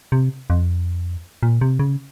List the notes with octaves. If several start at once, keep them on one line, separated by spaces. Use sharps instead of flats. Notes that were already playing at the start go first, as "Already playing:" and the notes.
C3
F2
A#2
C3
C#3